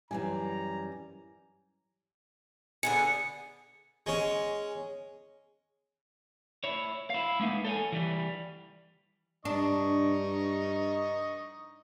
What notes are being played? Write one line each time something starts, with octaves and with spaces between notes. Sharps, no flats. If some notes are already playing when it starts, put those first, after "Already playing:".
F#2 E3 G3 G#5 A#5
D3 B3 G#4 C#7
G#3 C#4
E4 C#5
E4 F5
G#3 A#3 B3 D#4
A4 C#5 F5 G#5
E3 G3
G2 D4 D#4 D#5 C#6